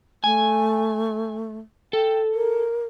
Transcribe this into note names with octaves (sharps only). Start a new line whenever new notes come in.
A3 G#5
A4 G5
A#4